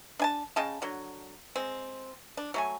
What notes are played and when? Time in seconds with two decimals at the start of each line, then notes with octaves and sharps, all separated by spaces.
0.19 D4 G#5 A5
0.56 C#3 D#5 G5 A5
0.82 D3 F#3
1.56 G#3 C4
2.37 D4
2.54 F#3 A3 G#5